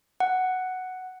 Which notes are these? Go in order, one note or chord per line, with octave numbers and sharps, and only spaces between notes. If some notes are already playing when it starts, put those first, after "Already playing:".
F#5